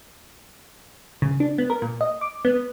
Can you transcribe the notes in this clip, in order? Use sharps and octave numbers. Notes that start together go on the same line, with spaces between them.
C#3
D4
B3
A#4
A#2
D#5
D6
B3